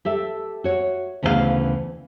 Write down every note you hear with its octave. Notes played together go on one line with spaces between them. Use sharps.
G4 A4 E5
F#4 C#5
D2 C#3 E3 B3 G4 F5